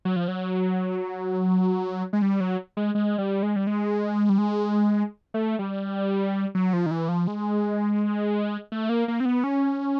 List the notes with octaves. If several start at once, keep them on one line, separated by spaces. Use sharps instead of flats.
F#3
F3
F#3
G#3
G3
F#3
G#3
G#3
G3
G#3
G3
G#3
G3
G#3
A3
G3
F#3
F3
D#3
E3
F3
G#3
A3
A#3
A#3
C4
B3
C#4